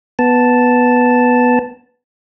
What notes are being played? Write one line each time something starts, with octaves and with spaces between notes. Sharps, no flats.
B3 A5